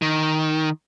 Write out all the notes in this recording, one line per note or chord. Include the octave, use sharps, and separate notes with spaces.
D#3